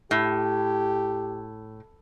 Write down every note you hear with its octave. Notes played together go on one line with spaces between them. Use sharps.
A2 G4